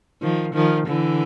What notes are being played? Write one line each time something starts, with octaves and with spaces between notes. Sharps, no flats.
D#3 F3
D#3 F3
D3 E3